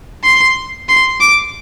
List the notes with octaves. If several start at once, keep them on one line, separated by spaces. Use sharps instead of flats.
C6
C6
D6